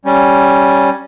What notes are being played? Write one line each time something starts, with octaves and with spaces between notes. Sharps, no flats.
G3 C#4